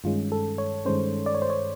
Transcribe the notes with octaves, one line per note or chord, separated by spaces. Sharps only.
G2 D#3 G#3 C#4 F4
A4
C#5
G2 D#3 G#3 C#4 C5
D5
C#5
C5
C#5